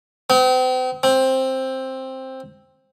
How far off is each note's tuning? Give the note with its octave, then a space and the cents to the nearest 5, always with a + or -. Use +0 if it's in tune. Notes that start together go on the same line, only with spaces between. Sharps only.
C4 -40
C4 +10